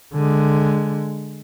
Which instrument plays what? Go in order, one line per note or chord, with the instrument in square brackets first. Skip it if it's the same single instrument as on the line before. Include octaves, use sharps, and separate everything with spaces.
[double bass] D3 G#3